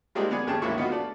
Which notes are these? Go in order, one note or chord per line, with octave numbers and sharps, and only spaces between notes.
G3 G#3 A#3 C4 D4 D#4
B3 G#4 D5 G#5
D#2 C#3 A3 G#4 G5 A5
C#2 G#2 A#3 E4 C#6
B3 D#4 F4 F#4
A3 D5